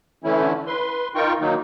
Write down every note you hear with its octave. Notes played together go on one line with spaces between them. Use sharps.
D3 E3 A3 C#4 E4
B4 C6
D#4 F4 A#4 G5 C#6
D#3 F#3 A#3 D#4